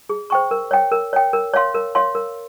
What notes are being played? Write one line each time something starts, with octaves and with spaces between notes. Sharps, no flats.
G#4
C5 G5 C#6
A#4
C#5 G5
A#4
C#5 G5
A#4
C#5 F5 C6
A#4
C#5 F5 C6
A#4